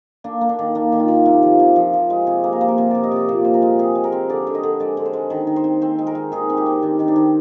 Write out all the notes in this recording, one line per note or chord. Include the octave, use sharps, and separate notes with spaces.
A#3 D4
A#3
D4
D#3
A#3 D4
D#3
F4
D#3
C3
F3
C3
F3
F3
G#3
C3 G#4
A#3
A#4
A#3 C5
A#4
C3 C5
C3 D5
D#5
C3 D5
A#2 C5
G#3 C5
A#4
G#3
C4 G#4
G#3
A#4
C4
D3 D5
D3
D#5
D3
G#3 D5
D3
C5
G#3
D#3
D#3
C5
C4
C4 C5
G#3
A#4
G#3
D#3 G#4
C4
G4
C4
D#3 D4
D#3 D#4
D4
D#3